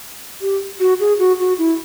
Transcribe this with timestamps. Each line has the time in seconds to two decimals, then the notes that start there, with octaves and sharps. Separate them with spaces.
0.41 G4
0.80 F#4
1.00 G#4
1.19 F#4
1.39 F#4
1.58 E4